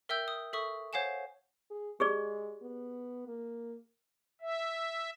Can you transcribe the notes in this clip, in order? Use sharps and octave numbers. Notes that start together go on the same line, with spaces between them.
A#4 E5 G5 E6 G6
D#6
A4 E5 C#6 D#6
C5 C#5 F5 F#5 G#5 E7
G#4
G#3 G4 G#4 D5
B3
A#3
E5